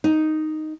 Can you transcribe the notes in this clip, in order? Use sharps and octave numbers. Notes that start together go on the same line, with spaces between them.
D#4